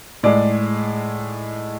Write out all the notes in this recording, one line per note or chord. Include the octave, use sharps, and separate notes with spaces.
A2 G#3 D5